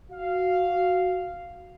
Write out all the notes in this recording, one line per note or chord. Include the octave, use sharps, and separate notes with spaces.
F#4 F5